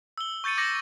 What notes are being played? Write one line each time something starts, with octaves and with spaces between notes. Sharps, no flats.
E6 G7
C#6 G6 A6 C#7 D#7
D6 G6 A#6 C#7 F#7